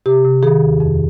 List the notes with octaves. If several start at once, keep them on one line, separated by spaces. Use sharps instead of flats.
C3 G4
C3
D#3 G#4
D#2
F2